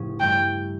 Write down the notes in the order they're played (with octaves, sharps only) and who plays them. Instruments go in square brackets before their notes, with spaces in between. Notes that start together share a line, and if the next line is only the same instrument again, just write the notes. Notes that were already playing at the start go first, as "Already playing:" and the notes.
Already playing: [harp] F1 A2 C#3 F3 C#4
[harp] G2 E3 A3 [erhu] G5